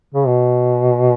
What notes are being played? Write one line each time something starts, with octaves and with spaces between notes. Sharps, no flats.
C#3
B2